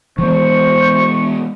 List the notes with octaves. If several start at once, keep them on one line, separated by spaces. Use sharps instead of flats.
E3 G#3 B3 C5 C#6